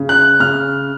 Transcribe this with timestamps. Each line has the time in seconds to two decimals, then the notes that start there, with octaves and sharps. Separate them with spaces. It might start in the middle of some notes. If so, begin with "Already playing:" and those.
Already playing: C#3
0.09 F#6
0.40 C#3 F6